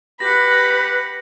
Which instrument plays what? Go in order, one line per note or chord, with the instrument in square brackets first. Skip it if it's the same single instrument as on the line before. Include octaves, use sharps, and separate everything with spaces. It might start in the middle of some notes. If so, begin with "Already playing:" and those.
[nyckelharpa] G4 F#5 [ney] B4 [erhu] B5 [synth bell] A#6